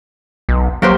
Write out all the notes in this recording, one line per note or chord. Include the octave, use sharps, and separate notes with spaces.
B1
F#3 A#3 G4 C5